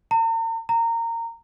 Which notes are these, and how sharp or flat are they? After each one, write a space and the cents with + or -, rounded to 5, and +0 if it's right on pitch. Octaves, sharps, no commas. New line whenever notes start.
A#5 -45
A#5 -20